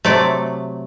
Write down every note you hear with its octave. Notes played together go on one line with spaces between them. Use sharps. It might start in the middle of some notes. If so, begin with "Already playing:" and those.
C3 F#3 A3 D5